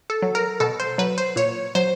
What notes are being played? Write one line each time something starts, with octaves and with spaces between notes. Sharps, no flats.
A4
F#3
A#4
B2 A4
C5
F#3 B4
C5
A#2 C#5
F#3 C5